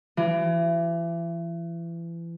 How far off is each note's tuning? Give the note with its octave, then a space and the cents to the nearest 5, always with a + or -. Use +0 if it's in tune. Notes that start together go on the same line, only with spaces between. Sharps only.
E3 +35